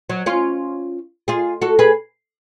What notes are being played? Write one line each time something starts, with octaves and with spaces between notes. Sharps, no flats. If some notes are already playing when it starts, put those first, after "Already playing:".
F#3
C#4 F4
F4 G#4
F#4 A4
G#4 B4